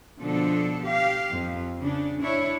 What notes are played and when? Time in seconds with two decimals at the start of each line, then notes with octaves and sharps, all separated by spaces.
0.20 B2 D3 F3 D4 A4
0.84 G4 F5
1.32 F2
1.80 C#3 D4
2.22 D4 E4 C#5